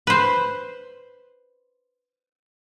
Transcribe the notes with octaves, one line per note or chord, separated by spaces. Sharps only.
B4 C5